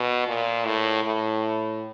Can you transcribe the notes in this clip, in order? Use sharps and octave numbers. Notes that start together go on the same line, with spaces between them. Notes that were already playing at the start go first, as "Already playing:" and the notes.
Already playing: B2
A#2
A2
A2